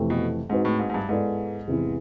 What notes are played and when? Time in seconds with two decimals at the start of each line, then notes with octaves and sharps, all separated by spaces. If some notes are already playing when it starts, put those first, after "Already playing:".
Already playing: F2 C3 E3 A3
0.10 B2
0.49 G#2 G#3 C4 D#4 F#4 B4
0.65 A2
0.79 G#2
0.90 G#2
0.94 G2
1.08 G#2 G#3 B3 E4 A4 D5
1.68 E2 C3 E3